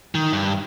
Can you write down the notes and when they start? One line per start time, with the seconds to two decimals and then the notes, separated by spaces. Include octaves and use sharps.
0.15 D#3
0.33 G2